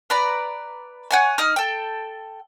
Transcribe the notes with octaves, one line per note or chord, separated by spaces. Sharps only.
B4 D5 A#5 B5
C#5 F#5 G#5
D#4 D#6 F6
A4 G5